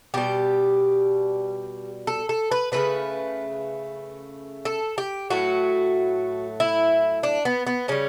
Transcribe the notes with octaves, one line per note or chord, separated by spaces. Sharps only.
B2 G3 G4
A4
A4
B4
C#3 E3 A3 B4
A4
G4
A2 F#3 A3 F#4
E4
D4
B3
B3
C#3 G3 C#4